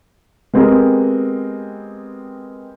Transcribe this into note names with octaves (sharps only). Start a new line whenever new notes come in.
G#3 B3 C4 G4 G#4 A#4